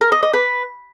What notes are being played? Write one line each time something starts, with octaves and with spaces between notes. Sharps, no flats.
A#4
D#5
D#5
B4